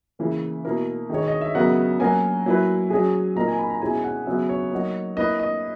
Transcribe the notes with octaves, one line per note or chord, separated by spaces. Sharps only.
C#3 E3 A#3 E4 A#4
B2 A#3 E4 A#4
D#3 G#3 D#4 C#5
D#5
E5
C#3 F#3 B3 F#4 A#4 F#5
F#3 A#3 C#4 F#4 A#4 G#5
F#3 A#3 E4 B4
F#3 C#4 G#4
A#2 A#3 D#4 A#4 A#5
G#5
B5
A#5
B2 G#3 C#4 E4 G#5
F#5
C#3 F#3 B3 E5
C#5
F#3 A#3 D#4 F#4
A#3 E4 B4 D#5
D#5